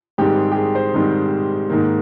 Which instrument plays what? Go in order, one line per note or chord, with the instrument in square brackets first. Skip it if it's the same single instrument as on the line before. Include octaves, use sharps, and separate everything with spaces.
[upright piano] G#2 D#3 G3 C4 G4
G#4
G4
G#4
C5
G#2 D#3 G3 C4
G#2 D#3 A#3